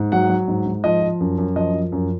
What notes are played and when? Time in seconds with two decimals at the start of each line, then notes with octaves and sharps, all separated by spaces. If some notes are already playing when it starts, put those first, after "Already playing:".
Already playing: G#2
0.12 F#3 F#5
0.30 F#3
0.48 G#2
0.66 G#2
0.84 F3 D#5
1.02 F3
1.20 F#2
1.38 F#2
1.56 F3 D#5
1.74 F3
1.92 F#2